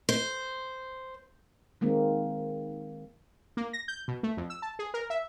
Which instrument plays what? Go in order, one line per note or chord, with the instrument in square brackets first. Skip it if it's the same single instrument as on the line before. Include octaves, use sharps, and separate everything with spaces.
[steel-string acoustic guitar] C5
[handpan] D#3 G#3 A#3 C4
[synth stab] A#3
A#6
G6
B2
A3
F2
E6
A5
G#4
A#4
E5